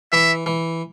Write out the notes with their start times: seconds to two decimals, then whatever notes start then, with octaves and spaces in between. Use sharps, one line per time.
0.12 E3 E5
0.46 E3